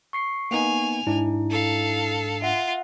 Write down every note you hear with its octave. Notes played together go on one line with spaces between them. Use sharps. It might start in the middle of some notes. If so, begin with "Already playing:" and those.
C#6 C7 C#7
A#3 B3 D#4 G#5 F7
G#2 D4 E4
A4 F5
F4 E5 F#5